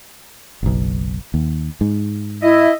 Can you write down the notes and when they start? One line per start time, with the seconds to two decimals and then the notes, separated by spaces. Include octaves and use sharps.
0.63 F#1 B1
1.34 D#2
1.81 G#2
2.42 E4 D#5 E5